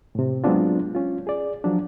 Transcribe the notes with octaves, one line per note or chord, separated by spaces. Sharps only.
A2 C3
F#3 G#3 B3 C4 D4 F4
C#4 F4
G#4 D5
F3 F#3 D4